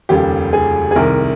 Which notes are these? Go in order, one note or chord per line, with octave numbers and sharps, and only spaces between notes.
F1 D#2 C#3 G3 G4
G#4
G#4
C2 C3 D#3 A#4